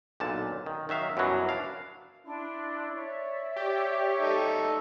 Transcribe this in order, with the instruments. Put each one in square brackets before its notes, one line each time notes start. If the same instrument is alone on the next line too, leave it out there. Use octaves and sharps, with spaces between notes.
[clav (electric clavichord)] B1 A#2 D3 A5
D#3
D#3 F#3 E5 F5
F#2 B2 E3 F#3 G3
D4 F5
[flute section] D4 C6 [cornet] E4
[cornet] C#5 [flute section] D5 E5
[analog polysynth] G4 [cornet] C#5
[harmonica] D#4 A4 C#6